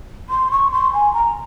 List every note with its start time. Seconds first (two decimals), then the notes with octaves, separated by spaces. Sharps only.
0.29 C6
0.51 C#6
0.72 C6
0.93 G#5
1.13 A#5